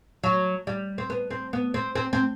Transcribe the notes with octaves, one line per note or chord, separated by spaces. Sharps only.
F#3
G3
C4
B3
C4
B3
C4
C4
C4